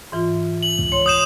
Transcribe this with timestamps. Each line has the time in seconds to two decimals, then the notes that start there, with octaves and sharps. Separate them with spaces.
0.12 G#2 E3 F4
0.63 F#7
0.79 C#2
0.92 C#5 C6
1.06 D#6 G6 E7